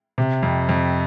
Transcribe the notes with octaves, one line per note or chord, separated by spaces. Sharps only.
C3
F2
F2